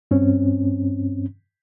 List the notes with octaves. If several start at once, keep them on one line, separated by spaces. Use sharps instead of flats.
G2 C4 C#4